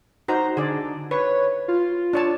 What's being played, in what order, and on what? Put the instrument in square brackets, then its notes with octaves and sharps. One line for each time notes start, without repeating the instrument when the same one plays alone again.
[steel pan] D#4 F#4 C5 [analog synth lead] A#5
[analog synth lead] D3 [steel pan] G#4 D5
[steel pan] B4 [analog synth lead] C#5
[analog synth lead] F4
[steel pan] D4 C#5 A5